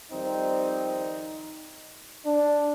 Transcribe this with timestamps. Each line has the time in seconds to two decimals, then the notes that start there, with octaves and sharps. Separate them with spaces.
0.10 F2 D#3 G3 C4 D#4
2.25 D4